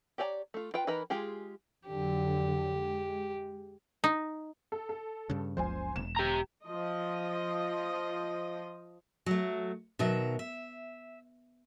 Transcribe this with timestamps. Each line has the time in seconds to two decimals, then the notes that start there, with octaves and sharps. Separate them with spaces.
0.18 G4 C#5 D5 G#5 A#5
0.54 A3 F4
0.74 F4 B4 G5
0.87 E3 D#4 A#4 B4 B5
1.10 G#3 F4 G4 G#4
1.87 F2 D3 F#3 G4
2.76 G#3
4.04 D#4
4.72 A4
4.89 A4
5.30 G2 C#3
5.57 F#1 C#2 F3 C5 G#5
5.96 E1 E7
6.16 G4 A#5
6.66 F3 D#5
9.26 F#3 A3
9.99 B2 D#3 F#3 E5
10.39 E5